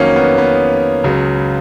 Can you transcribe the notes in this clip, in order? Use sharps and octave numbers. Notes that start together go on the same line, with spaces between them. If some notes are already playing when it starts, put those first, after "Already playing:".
Already playing: F2 D#3 F#3 A#3 C#4
B3
B3
C#2 C#3 F#3